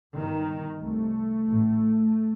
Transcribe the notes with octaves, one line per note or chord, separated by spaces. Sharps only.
G1 G2 D#3
C2 C3 A3
A1 A2